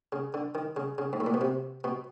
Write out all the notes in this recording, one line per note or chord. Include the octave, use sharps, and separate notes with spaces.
C#3
D3
D#3
C#3
C#3
G#2
A2
A#2
B2
C3
B2